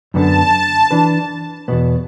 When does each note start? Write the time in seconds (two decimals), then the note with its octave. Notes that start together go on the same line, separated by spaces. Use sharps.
0.14 F#2 D3 B3 A5
0.91 E3 D4 B4
1.68 E2 B2 B3